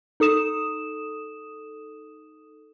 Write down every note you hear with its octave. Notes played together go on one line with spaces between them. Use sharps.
D#4 A4 D#6 E7